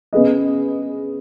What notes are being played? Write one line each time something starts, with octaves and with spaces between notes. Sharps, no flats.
C#3 B3 G#4 B4 D#5